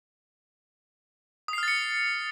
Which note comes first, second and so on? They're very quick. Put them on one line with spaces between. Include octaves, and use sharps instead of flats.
D#6 C7 F6 A6 C#7